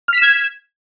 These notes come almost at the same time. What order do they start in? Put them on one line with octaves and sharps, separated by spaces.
F6 B6 E7 G#6